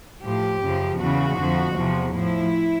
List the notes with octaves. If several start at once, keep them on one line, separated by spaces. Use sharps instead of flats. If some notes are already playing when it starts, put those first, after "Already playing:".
A2 F3 G4
F#2 C#3 F3
E2 C#3 E3 F#4
F2 D3 F3
E2 C3 F3
A2 F3 E4